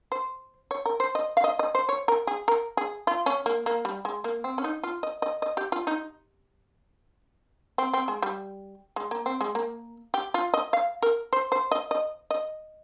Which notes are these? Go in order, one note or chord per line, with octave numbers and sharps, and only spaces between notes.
C5
C#5
A#4
C5
D#5
F5
D#5
D#5
C5
C#5
A#4
G#4
A#4
G#4
F4
C#4
A#3
A#3
G3
G#3
A#3
C4
C#4
D#4
F4
D#5
D#5
D#5
G4
F4
D#4
C4
C4
G#3
G3
G#3
A#3
C4
G#3
A#3
G4
F4
D#5
F5
A#4
C5
C5
D#5
D#5
D#5